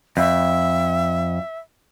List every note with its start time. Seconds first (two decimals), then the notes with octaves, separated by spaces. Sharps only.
0.17 F2 E5